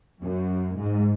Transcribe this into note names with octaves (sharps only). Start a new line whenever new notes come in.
F#2
G#2